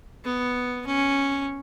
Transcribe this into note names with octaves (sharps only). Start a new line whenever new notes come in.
B3
C#4